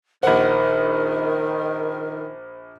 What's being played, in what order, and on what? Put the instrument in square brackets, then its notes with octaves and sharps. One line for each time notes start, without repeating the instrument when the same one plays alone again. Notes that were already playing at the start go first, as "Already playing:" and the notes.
[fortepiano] A#1 F#5 [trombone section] D#3 [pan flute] A#4 [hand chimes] C5